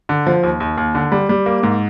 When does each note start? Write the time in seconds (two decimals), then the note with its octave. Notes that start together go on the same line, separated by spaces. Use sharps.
0.09 D3
0.27 F3
0.43 D#2
0.60 D#2
0.77 D#2
0.95 D3
1.12 G3
1.29 G3
1.46 A#3
1.63 G#2